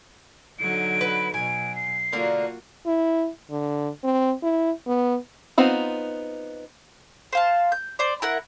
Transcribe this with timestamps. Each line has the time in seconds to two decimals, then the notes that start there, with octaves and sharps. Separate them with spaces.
0.59 D3 F#3 D#4 D7
1.01 B4
1.34 B2 F#3 G#5 D7
1.76 C7
2.13 D3 A#3 F4 F#4 A#4
2.86 E4
3.51 D3
4.04 C4
4.43 E4
4.87 B3
5.58 B3 C4 D#4 F4
7.33 C5 F5 A5
7.72 G6
7.99 C5 D5
8.22 E4 A#4 F#5